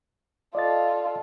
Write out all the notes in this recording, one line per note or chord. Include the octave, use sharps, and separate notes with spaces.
F4 A4 D5 D#5 A6